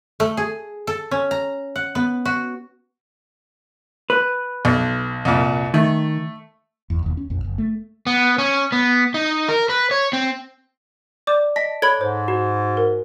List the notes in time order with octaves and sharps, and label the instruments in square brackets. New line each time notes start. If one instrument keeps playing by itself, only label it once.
[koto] A3
G#4
A4
C#4
A#5
F#5
B3
F#4
[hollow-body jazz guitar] B4
[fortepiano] B1
C2 F2 A#2
[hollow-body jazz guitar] D#3 [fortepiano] A3
[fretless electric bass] G1 E2
E1 D#2
C#4
A#1 F2
F#1
A3
[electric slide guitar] B3
C#4
B3
D#4
A#4
B4
C#5
C4
[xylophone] D5 D6 G6
[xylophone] D#5 A#6 B6 [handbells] A5
[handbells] A4 C#5 [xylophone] B5 G#6
[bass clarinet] G#2 [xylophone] C5
[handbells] F#4
[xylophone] A#4